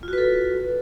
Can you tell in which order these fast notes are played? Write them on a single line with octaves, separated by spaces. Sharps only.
F4 F#4 B4 A4